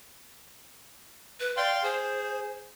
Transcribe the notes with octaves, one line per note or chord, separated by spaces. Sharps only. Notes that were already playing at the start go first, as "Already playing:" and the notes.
B4
D5 F5 G5 C6
G#4 C5